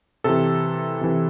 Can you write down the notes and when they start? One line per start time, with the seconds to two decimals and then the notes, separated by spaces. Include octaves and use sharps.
0.24 C3 E3 A4
1.01 C3 E3